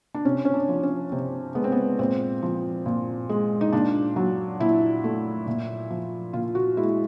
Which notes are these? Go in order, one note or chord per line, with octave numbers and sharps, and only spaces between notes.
D4
C3 C#4
C#4
D4
F3
C#4
C3 C4
G#3 B3
C4
B3
A#2 C4
F3
A#2
G#3
D#4
A#2 D4
F#3
A#2 E4
A3
A#2
F3
A#2 F4
F#4
G#3 E4